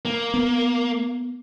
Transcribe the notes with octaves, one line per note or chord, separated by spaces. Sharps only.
A#3
B3